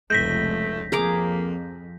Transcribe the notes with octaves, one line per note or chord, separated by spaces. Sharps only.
F1 C#2 A3 G6 A#6 B6
F2 A#3 G#4 A#5 D6